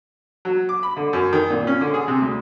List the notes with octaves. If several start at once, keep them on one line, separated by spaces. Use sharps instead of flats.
F#3
D6
B5
D3
F#2
D#3
A#2
C#4
D3
G#4
C3
D2